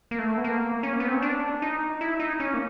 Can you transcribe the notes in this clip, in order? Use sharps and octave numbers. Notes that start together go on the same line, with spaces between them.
A#3
A3
B3
A#3
C#4
A#3
B3
C4
C#4
D4
D#4
E4
D#4
C#4
A#3